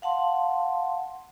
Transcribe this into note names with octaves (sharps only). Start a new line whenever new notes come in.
F5 F#5 A5 C6